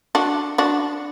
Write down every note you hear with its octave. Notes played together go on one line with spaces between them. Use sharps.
D4 F#4
D4 F#4